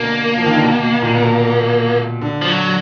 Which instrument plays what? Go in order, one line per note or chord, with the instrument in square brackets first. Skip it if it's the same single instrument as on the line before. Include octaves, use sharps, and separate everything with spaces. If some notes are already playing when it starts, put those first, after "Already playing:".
Already playing: [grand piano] B2 D3 [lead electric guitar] A#3
[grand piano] F3
D#3
D3
B2
B2
A#2
B2
D3
[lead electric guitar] F3
F#3